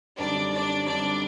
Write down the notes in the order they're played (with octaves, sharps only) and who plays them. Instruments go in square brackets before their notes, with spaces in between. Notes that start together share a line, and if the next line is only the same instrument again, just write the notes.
[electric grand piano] F#2 D3 G3 C4 D#4 [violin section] D4 D5
[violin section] D4 D5
[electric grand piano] F#2 D3 G3 C4 D#4 [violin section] D4 D5